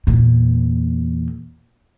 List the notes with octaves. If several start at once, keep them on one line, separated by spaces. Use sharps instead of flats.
E2 A#2